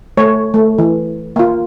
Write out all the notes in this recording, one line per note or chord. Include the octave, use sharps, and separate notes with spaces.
A3 C#5
A3
E3
A#3 F4